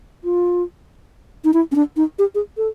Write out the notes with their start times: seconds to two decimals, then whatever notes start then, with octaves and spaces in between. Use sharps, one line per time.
0.24 F4
1.45 D#4
1.54 E4
1.72 C#4
1.76 D4
1.97 D#4
2.19 G4
2.35 G#4
2.57 A4